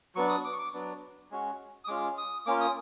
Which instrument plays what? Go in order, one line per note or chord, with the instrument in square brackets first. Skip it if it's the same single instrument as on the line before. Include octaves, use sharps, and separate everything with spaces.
[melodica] F#3 B3 D4 C#6
D#6
D6
C#6
D6
F#3 B3 D4
G#3 C#4 F#4
D#6
G#3 C#4 F4 D6
D#6
A#3 C#4 F4 D6
D#6